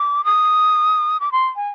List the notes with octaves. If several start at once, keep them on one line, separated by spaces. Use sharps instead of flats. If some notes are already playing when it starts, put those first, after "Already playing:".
Already playing: D6
D#6
D6
C6
G#5